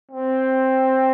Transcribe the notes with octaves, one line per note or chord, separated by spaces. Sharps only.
C4